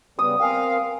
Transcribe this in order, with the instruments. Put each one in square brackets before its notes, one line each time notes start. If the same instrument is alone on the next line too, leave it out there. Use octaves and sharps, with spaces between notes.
[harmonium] C#3 G3 B3 [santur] D#6
[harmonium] C4 A#4 [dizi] F5 [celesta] G5 G#5